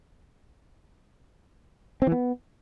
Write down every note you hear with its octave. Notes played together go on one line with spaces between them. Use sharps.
C4
E3
B3